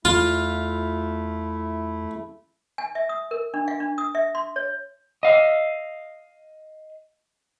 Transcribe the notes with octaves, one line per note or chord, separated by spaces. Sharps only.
E2 A3 E4 F4
G#5
E5
D#6
A#4
D4
F5
D4
D#6
E5
C6
C#5
D#5 F5